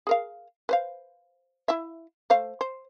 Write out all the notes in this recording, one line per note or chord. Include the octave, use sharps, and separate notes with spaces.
G#4 A#4 F5
B4 C5 F5
E4 E5
A3 C5 F5
C5